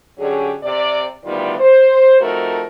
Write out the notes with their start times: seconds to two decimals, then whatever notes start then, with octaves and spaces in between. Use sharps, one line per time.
0.18 D3 F#3 C#4 G4 G#4
0.63 C3 D5
1.24 D2 D#3 G3 B3 F4 D5
1.59 C5
2.21 F3 A3 C4 D#4 F#4 A#4